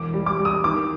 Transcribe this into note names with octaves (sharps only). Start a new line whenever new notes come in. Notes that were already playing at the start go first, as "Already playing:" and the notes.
Already playing: E1 D6
G3
D6
G3
D#6
D#3 D6